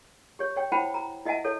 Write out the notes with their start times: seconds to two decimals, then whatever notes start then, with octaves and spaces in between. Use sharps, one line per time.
0.39 G4 C#5
0.56 C#5 G5
0.72 E4 C5 F#5 G5 A5 B5
0.94 A#5
1.25 E4 D#5 E5 F#5 G#5 A5
1.44 E4 A4 C#5